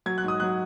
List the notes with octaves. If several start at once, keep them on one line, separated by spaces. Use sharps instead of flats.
F#3 G#6
F#6
G#2 D#6
F#3 F#6